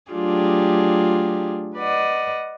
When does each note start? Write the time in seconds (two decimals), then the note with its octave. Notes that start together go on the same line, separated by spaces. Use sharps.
0.12 F#3 A3 D4 F4 G4 G#4
1.77 B4 D5 D#5 F#5